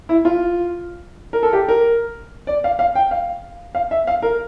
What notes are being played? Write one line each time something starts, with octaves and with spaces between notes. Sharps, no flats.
E4
F4
A#4
A4
G4
A#4
D5
F5
F5
G5
F5
F5
E5
F5
A#4